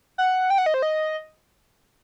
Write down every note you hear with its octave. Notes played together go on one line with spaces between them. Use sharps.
F#5
G5
F#5
D#5
C5
D#5